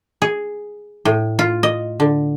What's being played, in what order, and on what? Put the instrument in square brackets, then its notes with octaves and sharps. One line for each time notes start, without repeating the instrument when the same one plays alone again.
[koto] G#4
A2
F4
D#5
D3